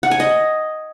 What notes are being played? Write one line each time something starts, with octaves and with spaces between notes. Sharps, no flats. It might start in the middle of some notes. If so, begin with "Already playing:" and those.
F#5
G#5
D#5